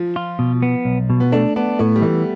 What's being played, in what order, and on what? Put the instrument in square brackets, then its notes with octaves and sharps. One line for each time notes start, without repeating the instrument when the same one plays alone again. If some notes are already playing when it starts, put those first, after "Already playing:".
Already playing: [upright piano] F3
[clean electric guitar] F4
B2
B3
B1
B2
[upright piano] B3
[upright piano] A3 [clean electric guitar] D4
[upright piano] B3 [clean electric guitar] D4
[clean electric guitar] A2 [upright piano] A3
[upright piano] G3
[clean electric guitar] E3 [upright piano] A3